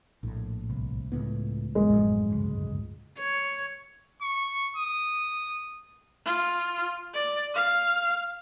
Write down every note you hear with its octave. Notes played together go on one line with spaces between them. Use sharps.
A#1 A2
C2
C#2 A2 B3
A1 E2 G#3
F#2 A2 F3
G1 C#2
C#5
C#6
D#6
F4
D5
F5